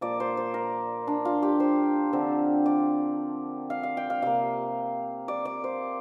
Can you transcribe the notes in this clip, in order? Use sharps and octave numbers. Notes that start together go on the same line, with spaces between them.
A#2 F3 A#3 D5
C5
C5
A#4
D4
F4
G4
C5
D3 F3 C4
D5
F5
F5
G5
F5
C3 A#3 F5
D5
D5
C5